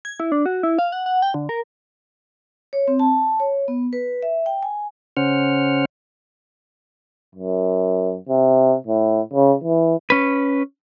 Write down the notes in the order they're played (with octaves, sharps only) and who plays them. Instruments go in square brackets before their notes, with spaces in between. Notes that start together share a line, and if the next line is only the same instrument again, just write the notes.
[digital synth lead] G#6
E4
D4
F#4
E4
F5
F#5
F#5
G5
D3
A#4
[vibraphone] C#5
C4
A5
C#5
B3
B4
E5
G5
G#5
[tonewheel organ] C#3 C#4 C5 F#5 F6
[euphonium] F#2
C3
A2
C#3
E3
[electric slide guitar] C#4 B4